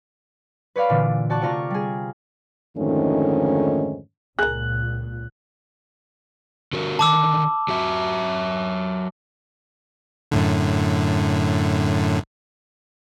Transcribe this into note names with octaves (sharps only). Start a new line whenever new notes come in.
B4 C#5 D5 F5 B5
A#2 D3 E3
F#4 D5 A5 C#6 F#6
C3 A3 F4 D5 A#5 C#6
G3 G#4
F2 G#2 D3 D#3 A3 C#4
C#2 A#2 G#4 A#4 F#6
D3 F#4 A#4
D3 D#3 A5 D6 E6
F#3 F#4 E5
F#2 A2 D3